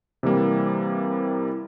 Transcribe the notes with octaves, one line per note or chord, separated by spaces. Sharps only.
C3 E3 G3 A#3